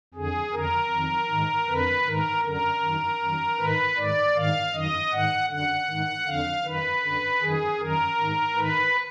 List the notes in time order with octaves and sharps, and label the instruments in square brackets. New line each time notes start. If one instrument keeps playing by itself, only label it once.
[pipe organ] F2 D3 G#4
F2 D3 A#4
F2 D#3
G#2 D#3
F2 D3 B4
G#2 D#3 A#4
F#2 D3 A#4
F#2 D#3
F#2 D#3
G#2 D#3 B4
G#2 D#3 D5
G#2 D#3 F5
F#2 D#3 D#5
G#2 D#3 F#5
F#2 D3 F#5
G#2 D#3
F2 D3 F5
F#2 D#3 B4
F#2 D3
F#2 D#3 G#4
F#2 D#3 A#4
G#2 D#3
G#2 D#3 B4